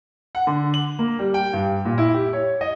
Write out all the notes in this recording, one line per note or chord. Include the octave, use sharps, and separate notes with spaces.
F#5
D3
F#7
A#3
G3
G5
G2
A#2
E4
G4
C#5
D#5